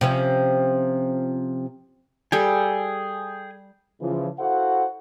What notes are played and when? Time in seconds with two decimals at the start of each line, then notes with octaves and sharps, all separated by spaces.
0.01 C3 F3 C#4
2.32 G3 G#4 A4 G5 G#5
4.01 C#3 E3 F3
4.38 E4 F#4 A4 C5 F5 F#5